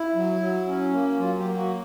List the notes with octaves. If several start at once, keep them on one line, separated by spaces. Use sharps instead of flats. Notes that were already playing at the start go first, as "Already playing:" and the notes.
Already playing: E4
F#3
F#3
C#4
A#3
F#3 F4
G4
A#3
F#4